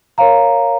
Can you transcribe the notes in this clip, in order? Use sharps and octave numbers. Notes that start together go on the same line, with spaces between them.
A#4 C#5 F5 A#5